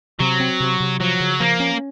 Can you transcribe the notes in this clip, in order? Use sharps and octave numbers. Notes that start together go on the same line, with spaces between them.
C3 F#3
C4
C3
C3
F3 F#3
C#3
F3 A#3
C#4